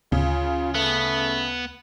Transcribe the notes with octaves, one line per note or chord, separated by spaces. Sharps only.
D2 C#3 F4
A3 B3